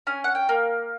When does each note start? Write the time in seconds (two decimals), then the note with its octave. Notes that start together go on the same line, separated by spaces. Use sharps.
0.07 C#4 G#5
0.24 F#5
0.35 G5
0.49 A#3